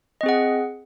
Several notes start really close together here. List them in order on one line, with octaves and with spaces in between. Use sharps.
D#5 C4 G#4 F#5